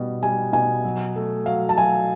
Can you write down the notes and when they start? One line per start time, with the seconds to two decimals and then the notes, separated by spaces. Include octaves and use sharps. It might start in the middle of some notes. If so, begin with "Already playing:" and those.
Already playing: B2 G3
0.23 G3 G#5
0.53 B2 G#5
0.84 F#3
1.16 A3
1.46 F#3 F5
1.69 A5
1.77 F#3 G#5